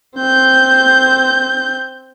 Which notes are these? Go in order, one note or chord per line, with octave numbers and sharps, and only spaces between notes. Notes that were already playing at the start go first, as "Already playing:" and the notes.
C4 G6